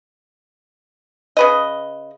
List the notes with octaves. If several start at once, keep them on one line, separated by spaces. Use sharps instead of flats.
C#3 B4 D#5